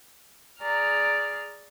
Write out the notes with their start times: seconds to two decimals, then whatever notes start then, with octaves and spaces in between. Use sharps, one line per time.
0.60 G#4 D5 A#5 F6